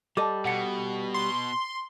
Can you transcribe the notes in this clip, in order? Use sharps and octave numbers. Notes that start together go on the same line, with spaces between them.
G3 A4 D#5 A5 D6
B2 F#5 C#7
C6